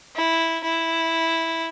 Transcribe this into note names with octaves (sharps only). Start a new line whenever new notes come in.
E4
E4